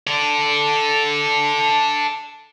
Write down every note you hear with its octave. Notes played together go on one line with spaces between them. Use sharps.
A4 D5